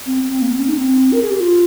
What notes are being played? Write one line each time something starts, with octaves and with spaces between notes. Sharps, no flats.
C4
C4
A#3
C4
C#4
D#4
C4
A#4
G#4
G4
F4